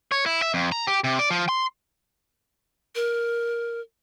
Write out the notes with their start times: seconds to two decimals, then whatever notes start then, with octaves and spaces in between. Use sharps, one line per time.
0.12 C#5
0.26 E4
0.42 E5
0.54 F2
0.72 A#5
0.87 G4
1.04 C3
1.19 D5
1.30 F3
1.49 C6
2.95 A#4